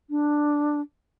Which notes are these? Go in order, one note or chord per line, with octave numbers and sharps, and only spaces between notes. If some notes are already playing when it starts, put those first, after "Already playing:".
D4